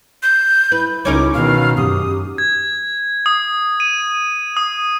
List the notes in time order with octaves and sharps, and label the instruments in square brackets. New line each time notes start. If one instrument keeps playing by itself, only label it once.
[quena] G6
[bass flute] E4 [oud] B4
[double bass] C#2 [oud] C#4 D#4 A#4 [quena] D6
[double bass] B2 D#3 [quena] F5
[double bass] F#2 [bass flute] G4 [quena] D#6
[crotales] G#6
D#6
D#7
D#6